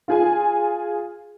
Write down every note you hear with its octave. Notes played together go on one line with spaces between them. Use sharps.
F4 G#4 G#5